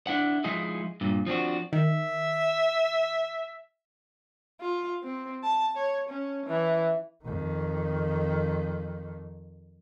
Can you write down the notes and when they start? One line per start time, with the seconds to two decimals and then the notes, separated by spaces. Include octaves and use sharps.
0.07 D4 E4 F#5
0.44 F3 G#3 D#4 E4 G#4 D#5
1.01 G2 A#2
1.27 F3 C4 D4 F#4
1.73 D#3 E5
4.61 F4
5.03 C4
5.44 A5
5.77 C#5
6.09 C#4
6.46 E3
7.25 F2 D#3